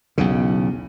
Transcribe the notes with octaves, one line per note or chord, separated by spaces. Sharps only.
B1 E2 C#3